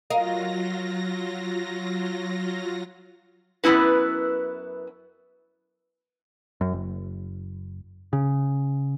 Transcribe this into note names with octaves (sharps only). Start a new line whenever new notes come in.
F#3 F4 A#4 D#5 F5 A#6
F#2 D#3 B3 E4 B4
F#2
F#1
C#3